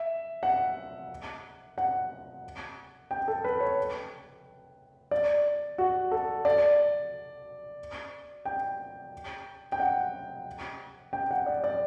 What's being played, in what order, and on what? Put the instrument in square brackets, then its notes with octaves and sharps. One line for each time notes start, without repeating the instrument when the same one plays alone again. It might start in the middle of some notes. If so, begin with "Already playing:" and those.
Already playing: [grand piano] E5
F#5
F#5
G5
A4
B4
C#5
D5
F#4
A4
D5
G5
G5
F#5
G5
F#5
D5
D5